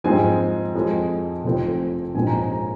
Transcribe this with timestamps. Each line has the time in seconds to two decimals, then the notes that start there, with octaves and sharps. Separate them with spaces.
0.04 G#2 F3 G#3 C4 G#5
0.74 F2 F3 G#3 C4
1.44 F1 F2 F3 C4
2.15 A#1 G#2 F3 G#3 C4 G#5
2.27 A#5
2.39 G#5
2.51 A#5